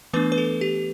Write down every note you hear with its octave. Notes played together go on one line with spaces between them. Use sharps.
E3 A3 B3 D4 B4
B4
A4
G4